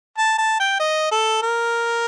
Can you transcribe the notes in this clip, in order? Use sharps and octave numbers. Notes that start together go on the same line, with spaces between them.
A5
A5
G5
D#5
A4
A#4